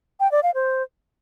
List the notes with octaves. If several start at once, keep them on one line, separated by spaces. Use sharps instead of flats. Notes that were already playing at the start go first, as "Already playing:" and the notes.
G5
D5
F5
C5